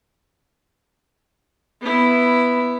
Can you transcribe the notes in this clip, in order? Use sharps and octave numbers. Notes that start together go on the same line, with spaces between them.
B3 E4